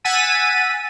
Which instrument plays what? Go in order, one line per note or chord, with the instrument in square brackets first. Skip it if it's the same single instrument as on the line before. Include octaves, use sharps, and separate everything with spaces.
[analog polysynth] F#5 G#5 E6 A6 B6 D#7